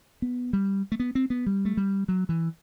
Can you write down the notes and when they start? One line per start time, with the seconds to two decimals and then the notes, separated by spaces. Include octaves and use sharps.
0.22 B3
0.53 G3
0.92 A3
1.00 B3
1.15 C4
1.30 B3
1.47 G3
1.65 A3
1.77 G3
2.08 F#3
2.29 E3